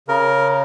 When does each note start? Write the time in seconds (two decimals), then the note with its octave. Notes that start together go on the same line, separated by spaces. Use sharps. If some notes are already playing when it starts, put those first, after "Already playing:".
0.08 C#3 A#4